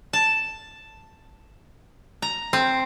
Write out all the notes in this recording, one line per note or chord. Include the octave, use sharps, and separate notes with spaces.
A5
A#5
C4